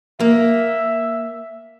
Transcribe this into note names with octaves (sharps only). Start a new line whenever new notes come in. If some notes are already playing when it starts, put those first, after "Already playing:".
A#3 E5